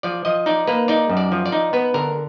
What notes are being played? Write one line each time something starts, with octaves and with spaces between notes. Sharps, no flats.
F3 D5
F3 D#5
D#4 D5
A#3 B4
D#4 D5
F#2
D5
F3
D5
D#4
B3 B4
D3 A#4